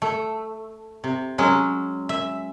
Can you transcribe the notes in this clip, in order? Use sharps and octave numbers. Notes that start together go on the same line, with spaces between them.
A3
C3
F#3 G#3 C#4
E5